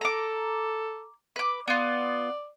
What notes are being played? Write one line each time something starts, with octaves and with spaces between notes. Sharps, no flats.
A4 A#5 D6
B4 D6
B3 F4 D5